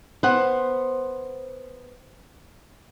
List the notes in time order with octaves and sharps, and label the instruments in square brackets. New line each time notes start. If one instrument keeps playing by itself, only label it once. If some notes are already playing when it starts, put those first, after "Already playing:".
[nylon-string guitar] B3 C5 F#5